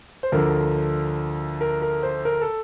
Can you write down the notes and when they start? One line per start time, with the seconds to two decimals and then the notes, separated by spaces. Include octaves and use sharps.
0.23 C5
0.32 D2 D3 F3 A#4
1.61 A#4
1.82 A#4
2.03 C5
2.25 A#4
2.41 A4